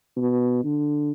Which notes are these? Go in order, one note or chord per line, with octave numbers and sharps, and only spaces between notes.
B2
D3